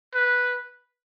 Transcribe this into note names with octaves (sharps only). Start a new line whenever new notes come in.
B4